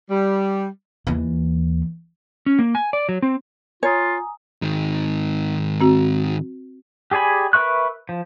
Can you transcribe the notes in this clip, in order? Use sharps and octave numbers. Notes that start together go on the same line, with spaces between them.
G3
D#2 E3
C#4
A#3
G#5
D5
F#3
C4
F4 C#5 G#5 A#5 D#6
G#2 D#3
C4 F#4
G4 G#4 D5 G#5 B5
A#4 B4 E5 C#6 F#6
F3